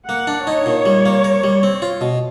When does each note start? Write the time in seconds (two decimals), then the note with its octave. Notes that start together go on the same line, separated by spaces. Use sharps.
0.08 A#3 F#5
0.27 D4
0.47 D#4 C#5
0.66 A#2
0.86 G3
1.06 A#3
1.24 A#4
1.44 G3
1.63 C4
1.82 F4
2.01 B2